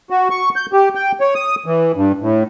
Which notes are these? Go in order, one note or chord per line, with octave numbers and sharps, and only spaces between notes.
F#4
C#6
G6
G4
G5
C#5
D#6
E3
G2
A2